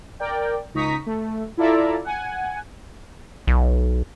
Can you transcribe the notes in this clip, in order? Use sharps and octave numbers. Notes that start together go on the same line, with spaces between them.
A#4 D5 G5
C#2 D#4 A#5 C#6 D#6 B6
A3
E4 F4 A4 D5 E5 A#5
F#5 G#5
B1